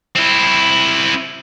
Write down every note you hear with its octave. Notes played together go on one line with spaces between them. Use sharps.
C4 E4